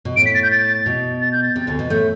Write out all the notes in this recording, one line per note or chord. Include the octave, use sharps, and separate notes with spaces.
B2
A2 D7
B6
A6
G6
A6
B2
A6
G6
A6
C3
D2 D3
B2 B3
A2 A3 G6